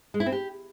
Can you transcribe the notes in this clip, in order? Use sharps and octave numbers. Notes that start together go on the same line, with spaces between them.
G#3
E4
C4
G4